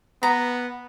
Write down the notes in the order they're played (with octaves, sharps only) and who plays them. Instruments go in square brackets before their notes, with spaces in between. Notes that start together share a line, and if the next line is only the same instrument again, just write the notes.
[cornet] B3 [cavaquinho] A#5